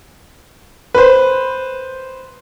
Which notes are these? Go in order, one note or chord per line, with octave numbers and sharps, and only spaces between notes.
B4 C5